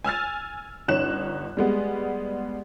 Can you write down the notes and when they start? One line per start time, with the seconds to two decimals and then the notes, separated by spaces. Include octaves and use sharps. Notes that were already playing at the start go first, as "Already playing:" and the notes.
0.04 G#5 E6 F6 A6
0.88 G1 C#4 D#4 F#6 E7
1.57 G3 G#3 B3